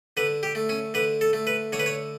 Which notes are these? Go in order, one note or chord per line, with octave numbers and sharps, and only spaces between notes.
D3 B4
G4
A3
C#4
D3 B4
A4
A3
B4
D3 C#5
B4
C#5